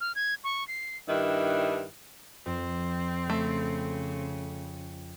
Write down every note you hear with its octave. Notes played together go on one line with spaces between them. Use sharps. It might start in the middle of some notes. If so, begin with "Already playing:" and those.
F6
G#6
C#6
C7
G2 D#3 D4 E4
F2 C4
C#3 A3